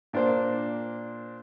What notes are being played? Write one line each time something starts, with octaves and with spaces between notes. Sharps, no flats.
A#2 D4 A#4 C5